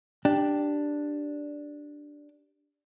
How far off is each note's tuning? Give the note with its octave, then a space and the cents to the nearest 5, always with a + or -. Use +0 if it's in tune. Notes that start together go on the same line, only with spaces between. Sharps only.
D4 +0 G4 +0